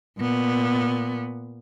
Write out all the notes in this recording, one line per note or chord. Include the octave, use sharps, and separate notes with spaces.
A#2 B3